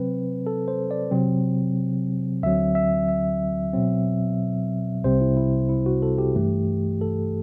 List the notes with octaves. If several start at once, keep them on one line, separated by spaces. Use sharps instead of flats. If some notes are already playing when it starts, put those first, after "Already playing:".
Already playing: C3 F#3 C4 B4
A4
C5
D5
C3 F#3 C4
D2 D3 F#3 C4 E5
E5
E5
B2 F#3 C4
C2 C3 G3 C4 C5
E4
E4
E4
F#4
A4
G4
G2 E3 A3
A4